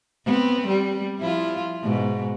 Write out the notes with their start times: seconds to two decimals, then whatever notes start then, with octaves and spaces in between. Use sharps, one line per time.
0.25 B3 C4
0.67 G3
1.19 F3 E4 F4
1.82 G#2 B2